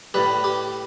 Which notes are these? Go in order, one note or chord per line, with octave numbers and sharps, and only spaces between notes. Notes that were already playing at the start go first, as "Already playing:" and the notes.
A2 G3 B4
G4